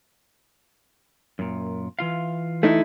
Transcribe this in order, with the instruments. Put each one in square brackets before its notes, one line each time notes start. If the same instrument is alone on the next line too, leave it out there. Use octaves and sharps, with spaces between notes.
[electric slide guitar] F#2 A#2
E3 F4 F5
[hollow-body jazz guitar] A3 D#4 E4